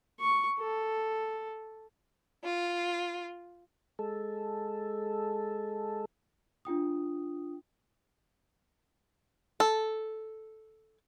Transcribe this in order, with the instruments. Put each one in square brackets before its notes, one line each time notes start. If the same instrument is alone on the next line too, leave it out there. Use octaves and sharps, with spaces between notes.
[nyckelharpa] C#6
A4
[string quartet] F4
[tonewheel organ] G#3 A4
[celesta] D4 F4 G5 D#6
[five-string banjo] A4